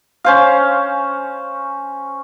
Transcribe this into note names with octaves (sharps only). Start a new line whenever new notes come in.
C#4 C5 F5